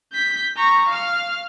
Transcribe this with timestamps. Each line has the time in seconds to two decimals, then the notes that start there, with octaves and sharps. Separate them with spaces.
0.13 G6 B6
0.56 A#5 C#6
0.89 F5 F6